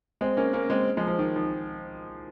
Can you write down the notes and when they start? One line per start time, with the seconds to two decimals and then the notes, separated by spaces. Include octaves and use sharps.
0.21 G#3 C4
0.37 A#3 C#4
0.53 A#3 C#4
0.70 G#3 C4
0.97 F3 G#3
1.08 F3
1.19 D#3
1.36 F3